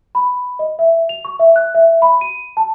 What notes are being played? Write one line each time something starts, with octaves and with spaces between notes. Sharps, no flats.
B5
D#5
E5
F7
C#6
E5
F#6
E5
B5
D#7
A5